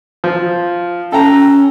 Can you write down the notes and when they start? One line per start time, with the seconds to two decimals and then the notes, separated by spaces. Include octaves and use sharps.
0.24 F3
1.12 C#4 A4 G5 A#5